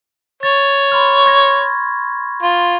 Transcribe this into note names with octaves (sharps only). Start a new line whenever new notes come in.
C#5 A6
B5 C6 F6
C#6 G#6 A#6
F4